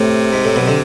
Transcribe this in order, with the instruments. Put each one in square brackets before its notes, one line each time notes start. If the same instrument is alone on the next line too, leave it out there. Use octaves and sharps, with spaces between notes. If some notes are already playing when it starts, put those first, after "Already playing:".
Already playing: [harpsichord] A2 [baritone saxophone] C3
[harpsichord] G#2
A2
B1 B2
D3